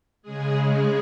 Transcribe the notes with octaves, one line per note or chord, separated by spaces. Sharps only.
C#3 G#3 G#4
G#4